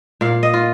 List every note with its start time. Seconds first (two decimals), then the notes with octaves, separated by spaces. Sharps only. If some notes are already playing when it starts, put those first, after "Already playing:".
0.21 A#2 F5
0.43 D#5
0.54 F4